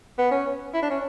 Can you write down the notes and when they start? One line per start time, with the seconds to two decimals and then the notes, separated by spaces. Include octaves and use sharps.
0.18 B3
0.31 C#4
0.74 E4
0.82 D4
0.90 C#4